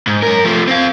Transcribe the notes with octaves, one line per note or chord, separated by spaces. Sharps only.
G#2
F#2 A#4
F3 A3
C4 F5